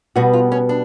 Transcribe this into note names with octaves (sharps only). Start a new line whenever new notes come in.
B2 G3 B3 F#4
F4
C#4
D4